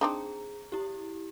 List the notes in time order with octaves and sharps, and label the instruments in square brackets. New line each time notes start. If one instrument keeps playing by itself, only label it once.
[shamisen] C4 D4 D#4 [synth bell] G#4 A#5
[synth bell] E4 G4